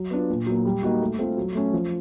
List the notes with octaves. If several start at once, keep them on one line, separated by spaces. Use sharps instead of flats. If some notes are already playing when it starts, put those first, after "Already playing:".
Already playing: F#3
B3 D4 F4
A#2
F#3
A#3
G3
A#3 D#4 F#4
A3
C4 F4 A4
F#3
A3 C#4
F3